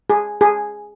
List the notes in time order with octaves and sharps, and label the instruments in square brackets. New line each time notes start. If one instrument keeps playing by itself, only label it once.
[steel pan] G#4
G#4